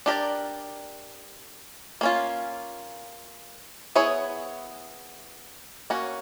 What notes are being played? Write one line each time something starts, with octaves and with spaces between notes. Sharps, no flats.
D4 G4 A#4 D5
A#3 C#4 F4
B3 E4 G#4 C#5
A#3 C#4 F#4